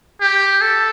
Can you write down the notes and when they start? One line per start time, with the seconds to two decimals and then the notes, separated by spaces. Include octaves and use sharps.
0.21 G4
0.62 A4